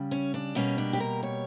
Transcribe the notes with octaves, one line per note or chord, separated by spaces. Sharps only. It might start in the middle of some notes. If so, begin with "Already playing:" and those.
Already playing: C#3 G3
C#4
D4
B2 G3 A#3 C#4
D4
G4
A#4
C#5